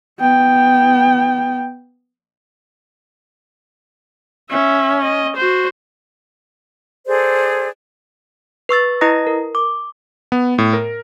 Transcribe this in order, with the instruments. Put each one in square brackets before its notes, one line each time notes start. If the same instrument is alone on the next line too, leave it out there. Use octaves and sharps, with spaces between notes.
[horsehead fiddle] B3 G5
[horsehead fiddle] C#4 [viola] E5
[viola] D#5
F#4 C5
[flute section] G#4 A4 C5 D5
[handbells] B4 C#6 E6 A6
E4 B4 D#5 A#5 D#6 A#6
A#4
D6
[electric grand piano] B3
A2
A#4